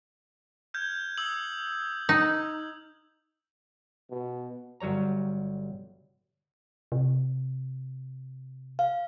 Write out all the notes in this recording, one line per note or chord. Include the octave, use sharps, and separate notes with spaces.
F6 G6 G#6
D#6 E6 F#7
D#4
B2
G1 F#3 G3 C#5 A#5
C3
F5